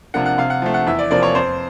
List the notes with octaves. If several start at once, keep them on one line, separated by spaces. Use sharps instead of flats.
C3 F3 A#3 D4 F#5
F#5
C3 F5
F#5
F3 A3
F#5
E2 E5
D5
C3 F3 A#3 D5
C#5
F2 C5